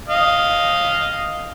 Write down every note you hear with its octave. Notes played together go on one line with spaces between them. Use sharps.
D#5 F5